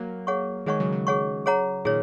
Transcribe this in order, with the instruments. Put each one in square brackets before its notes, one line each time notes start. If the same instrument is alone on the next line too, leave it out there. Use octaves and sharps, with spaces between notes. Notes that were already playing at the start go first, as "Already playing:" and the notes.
Already playing: [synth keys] F#3 A#3
[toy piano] G#4 C#5 F#5 C#6
[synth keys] D#3 G#3 [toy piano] G#4 C#5 F#5 C#6
[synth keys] C#3 F#3
C#3 F#3
[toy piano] G#4 C#5 F#5 C#6
G#4 C#5 F#5 A#5
[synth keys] A#2 D#3 [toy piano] G#4 C#5